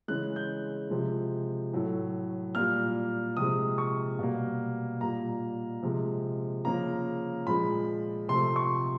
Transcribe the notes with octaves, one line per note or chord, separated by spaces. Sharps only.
C#3 E3 G#3 F#6
G6
C3 F3 G#3
A2 F#3 A3
A#2 G3 A#3 F6
C3 F3 G#3 D#6
C#6
B2 G3 A#3
A#2 G3 A#3 A#5
C3 F3 G#3
C#3 F3 A#3 A#5
A#2 F3 G#3 B5
C3 F3 A3 C6
C#6